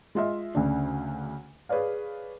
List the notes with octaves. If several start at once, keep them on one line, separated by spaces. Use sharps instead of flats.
G#3 F4 D#5 E5
D2 C#3 D4
G#4 B4 C#5 D5 F5